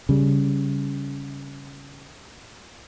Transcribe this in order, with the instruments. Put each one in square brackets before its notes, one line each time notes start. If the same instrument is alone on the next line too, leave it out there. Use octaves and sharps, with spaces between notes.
[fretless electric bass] C#3 G3